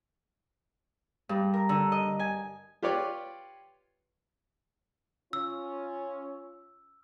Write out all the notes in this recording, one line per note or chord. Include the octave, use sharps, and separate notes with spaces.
G2
A#4
D3
D#5
G#5
F4 G4 B4 C#5 D5
C#4 F4 E6